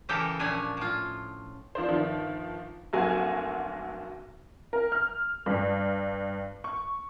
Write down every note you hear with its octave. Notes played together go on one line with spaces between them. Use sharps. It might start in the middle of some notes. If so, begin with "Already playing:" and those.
C#3 E3 G4 A4 A#4 G5
A#2 F3 C#4 D4 A4 G#5
A2 F4
F3 D4 C5
G1 D#3 F3
F1 D2 F#3 A#3 F#4 G#5
A#4
F6
G2
C#6